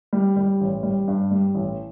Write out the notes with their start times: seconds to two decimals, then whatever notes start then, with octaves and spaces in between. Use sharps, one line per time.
0.13 G3
0.37 G3
0.61 A1
0.83 G3
1.08 G2
1.31 G3
1.55 A1